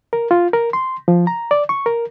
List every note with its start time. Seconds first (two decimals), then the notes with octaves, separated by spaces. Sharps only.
0.13 A#4
0.31 F4
0.53 A#4
0.73 C6
1.08 F3
1.27 A#5
1.51 D5
1.69 C#6
1.86 A#4